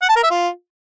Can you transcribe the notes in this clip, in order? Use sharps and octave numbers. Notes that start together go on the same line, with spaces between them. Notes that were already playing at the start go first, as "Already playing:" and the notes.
F#5
A5
A#4
E5
F4